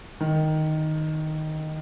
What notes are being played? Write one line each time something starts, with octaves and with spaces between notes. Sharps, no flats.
D#3